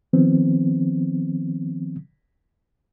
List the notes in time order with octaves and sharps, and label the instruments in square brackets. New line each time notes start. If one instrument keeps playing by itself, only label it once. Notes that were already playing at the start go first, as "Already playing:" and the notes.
[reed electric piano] D#3 F3 B3 C4